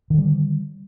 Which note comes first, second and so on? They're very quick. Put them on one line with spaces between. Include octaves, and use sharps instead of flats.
D#3 D3 G3